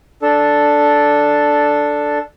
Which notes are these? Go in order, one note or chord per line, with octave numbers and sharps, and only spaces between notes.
D4 A4